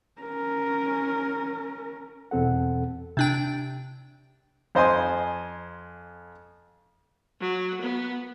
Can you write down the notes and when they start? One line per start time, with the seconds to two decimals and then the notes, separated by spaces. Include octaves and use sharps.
0.21 C#4 A#4
2.31 E2 B2 C4 A4 F#5
3.17 C3 D4 G5
4.75 F2 C5 D#5 G#5 C6
7.40 F#3
7.81 B3